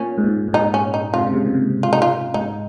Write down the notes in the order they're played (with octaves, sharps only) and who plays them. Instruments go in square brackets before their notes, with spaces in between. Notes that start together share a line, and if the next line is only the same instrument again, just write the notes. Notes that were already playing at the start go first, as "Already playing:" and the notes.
Already playing: [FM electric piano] A#2 [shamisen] C#4
[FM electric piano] G#2
A#2
G#2
[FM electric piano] A#2 [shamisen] D#4
[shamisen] C#4
D#4
[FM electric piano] G#2 C3 [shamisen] F4
[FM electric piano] C#3
G#2 C3
A#2
G#2 C3
[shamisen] F4
D#4
F4
[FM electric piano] G#2 [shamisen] D#4